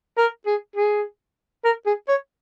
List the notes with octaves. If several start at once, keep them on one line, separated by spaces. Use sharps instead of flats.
A#4
G#4
G#4
A#4
G#4
C#5